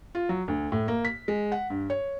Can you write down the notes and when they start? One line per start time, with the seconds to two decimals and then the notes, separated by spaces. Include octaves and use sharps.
0.15 F4
0.29 F#3
0.48 D2
0.72 A2
0.88 A#3
1.05 B6
1.28 G#3
1.52 F#5
1.70 G2
1.90 C#5